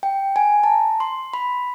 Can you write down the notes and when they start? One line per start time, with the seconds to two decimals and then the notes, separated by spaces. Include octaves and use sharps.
0.03 G5
0.36 G#5
0.63 A5
0.67 A#5
1.00 C6
1.34 B5